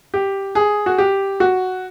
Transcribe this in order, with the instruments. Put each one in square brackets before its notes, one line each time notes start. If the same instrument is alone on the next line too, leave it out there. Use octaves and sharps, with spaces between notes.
[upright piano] G4
G#4
F#4
G4
F#4